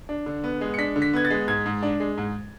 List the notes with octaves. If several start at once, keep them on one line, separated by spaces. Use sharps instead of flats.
D4
D3
B3
G#3
C#7
D4 B6
D3
B6
B3 G#6
A6
G#3
G#2 G#6
G#2
D4
G#3
G#2